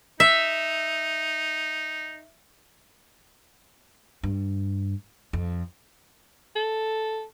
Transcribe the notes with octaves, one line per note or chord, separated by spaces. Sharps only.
D#4 E5
G2
F2
A4